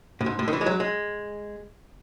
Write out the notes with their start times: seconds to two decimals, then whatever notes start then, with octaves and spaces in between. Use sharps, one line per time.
0.21 A2
0.26 G#2
0.39 A2
0.48 D#3
0.53 E3
0.61 G#3
0.66 F#3
0.80 G#3